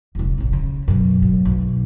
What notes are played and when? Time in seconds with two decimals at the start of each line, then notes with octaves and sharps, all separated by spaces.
0.15 E1 C2
0.38 D#1 A1
0.53 C#3
0.88 F#2 B2
1.22 F#2 A2
1.45 B1